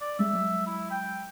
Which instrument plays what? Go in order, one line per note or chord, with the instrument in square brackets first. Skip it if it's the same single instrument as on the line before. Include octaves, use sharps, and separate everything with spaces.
[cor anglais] D5
[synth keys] G3 G#3 [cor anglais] E5
[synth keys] F#3 G#3
[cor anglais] E4
G5